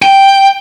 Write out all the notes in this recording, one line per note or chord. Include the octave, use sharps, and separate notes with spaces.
G5